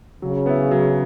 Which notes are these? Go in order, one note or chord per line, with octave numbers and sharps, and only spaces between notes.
C#3 F#3
B3 E4
F#3